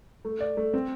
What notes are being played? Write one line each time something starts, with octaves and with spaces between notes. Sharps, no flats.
A3
D5
A3
C4